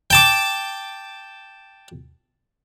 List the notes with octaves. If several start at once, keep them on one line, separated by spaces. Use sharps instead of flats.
G5 A5 D6